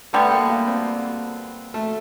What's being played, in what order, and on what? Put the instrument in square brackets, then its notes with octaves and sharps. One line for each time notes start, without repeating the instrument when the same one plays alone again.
[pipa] D3 G3 B3 [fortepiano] A3
[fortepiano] A#3
A#3
C4
A3